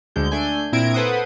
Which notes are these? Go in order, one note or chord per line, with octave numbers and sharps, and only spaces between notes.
D2 D3 G#3 G6
A3 D4 G#5 G6
A#2 C4 E4 A#4 G#6 D7
A4 B4 C5 F#5 D#6